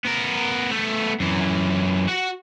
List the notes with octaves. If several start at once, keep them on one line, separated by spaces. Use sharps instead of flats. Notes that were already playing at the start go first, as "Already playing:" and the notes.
B3 A#4
A3 B3
F#2 E3
F#4 F#5